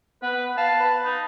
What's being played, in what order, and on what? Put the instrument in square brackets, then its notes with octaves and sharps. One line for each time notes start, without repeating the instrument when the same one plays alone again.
[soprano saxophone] B3 [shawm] B4
[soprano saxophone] F5 [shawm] A5
[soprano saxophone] B4
[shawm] D#4